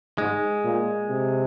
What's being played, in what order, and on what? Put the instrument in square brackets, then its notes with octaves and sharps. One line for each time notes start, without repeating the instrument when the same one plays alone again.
[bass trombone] G#2 [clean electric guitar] G#3
[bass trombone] A#2
C3